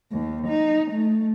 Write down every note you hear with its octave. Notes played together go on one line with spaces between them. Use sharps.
D#2
D#4
A3